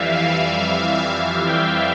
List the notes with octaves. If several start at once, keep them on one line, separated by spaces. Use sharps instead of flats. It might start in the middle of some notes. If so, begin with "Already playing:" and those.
Already playing: F2 E3 G3 E5 F5
F5
G5